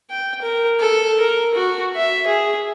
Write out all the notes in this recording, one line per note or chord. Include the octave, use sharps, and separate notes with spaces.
G5
A#4
A4
A#4
F#4
E5
G#4